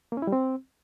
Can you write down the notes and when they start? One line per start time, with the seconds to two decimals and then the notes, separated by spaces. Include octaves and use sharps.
0.12 A#3
0.17 C#4
0.22 E4
0.27 G3
0.32 C4